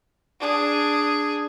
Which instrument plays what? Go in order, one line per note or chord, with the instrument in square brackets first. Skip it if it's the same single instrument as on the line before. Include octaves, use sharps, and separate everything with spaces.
[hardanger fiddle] D4 G#4